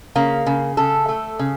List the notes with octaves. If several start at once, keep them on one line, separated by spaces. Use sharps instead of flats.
C#3 A#3
C#3
C#3 A4
A3
C#3